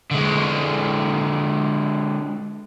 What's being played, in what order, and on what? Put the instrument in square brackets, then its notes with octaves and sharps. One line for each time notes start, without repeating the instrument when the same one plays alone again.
[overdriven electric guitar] D3 G#3